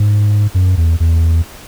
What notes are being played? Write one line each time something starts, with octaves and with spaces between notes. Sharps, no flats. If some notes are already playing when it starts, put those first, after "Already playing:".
Already playing: G#2
F#2
E2
E2